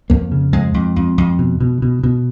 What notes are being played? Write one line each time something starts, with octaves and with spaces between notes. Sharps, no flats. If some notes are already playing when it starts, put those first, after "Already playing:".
F2 A#3
C#3
F2 G#3
F2
F2
F2
B2
B2
B2
B2